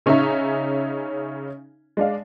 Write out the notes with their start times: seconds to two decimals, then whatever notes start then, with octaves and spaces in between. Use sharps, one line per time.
0.06 C#3 C#4 D#4 C#5 E5 A#5
1.97 G#3 D4 F5